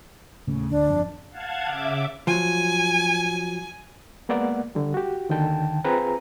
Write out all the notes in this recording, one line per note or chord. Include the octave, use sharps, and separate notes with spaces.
D#1 A2 C#3
D2 D4
G1 F2
F5 F#5 A5 G#6
C#3 E5 D6
F3 F#3 G#5
G#3 A#3 B3 D5 F#5
D3 G3
F#4 G4
D#2 D3 D#3 G5 A5
C4 F4 G#4 B4 A#5